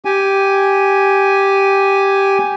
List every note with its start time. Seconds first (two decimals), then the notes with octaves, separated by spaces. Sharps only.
0.05 G4 G#5